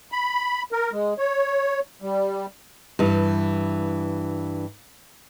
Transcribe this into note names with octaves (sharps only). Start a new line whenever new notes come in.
B5
A#4
G#3
C#5
G3
G2 E3